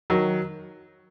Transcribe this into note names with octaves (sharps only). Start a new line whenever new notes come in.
D#3 F#3